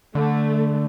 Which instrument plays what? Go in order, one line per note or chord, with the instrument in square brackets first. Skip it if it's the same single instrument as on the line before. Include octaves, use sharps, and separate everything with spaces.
[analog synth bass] D3 [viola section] A3